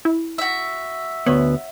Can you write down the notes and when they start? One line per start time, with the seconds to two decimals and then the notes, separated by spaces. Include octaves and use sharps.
0.05 E4
0.38 F#4 E5
1.26 D2 B3 C#5